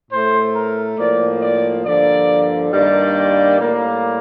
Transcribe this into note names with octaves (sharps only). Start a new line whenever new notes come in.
A2 A3 C5
A#4
A2 F3 A#3 D5
D5
G2 D3 F3 A#3 D5
G2 D#3 G3 A#3 D5
A2 G3 A#3